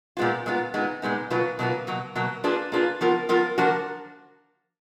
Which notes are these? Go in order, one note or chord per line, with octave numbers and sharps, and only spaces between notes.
A#2 G#3 B3 F4
A#2 G#3 B3 F4
A#2 G#3 B3 D#4
A#2 G#3 B3 D#4
B2 F#3 A#3 F4 B4
B2 F#3 A#3 F4 B4
B2 F#3 A#3
B2 F#3 A#3
A#3 D4 F4 G#4 B4
A#3 D4 F4 G#4 B4
F3 B3 F4 A#4
F3 B3 F4 A#4
F3 A#3 D4 F#4 A#4